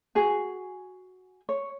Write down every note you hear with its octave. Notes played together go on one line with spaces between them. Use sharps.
F#4 G#4 G#5
C#5